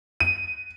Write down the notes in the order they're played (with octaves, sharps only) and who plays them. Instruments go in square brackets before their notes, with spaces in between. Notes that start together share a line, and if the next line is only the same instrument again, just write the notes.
[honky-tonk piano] D#7